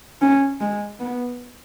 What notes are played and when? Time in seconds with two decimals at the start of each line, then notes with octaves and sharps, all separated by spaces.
0.22 C#4
0.61 G#3
0.99 B3